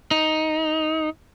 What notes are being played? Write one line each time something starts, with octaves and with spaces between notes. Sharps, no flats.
D#4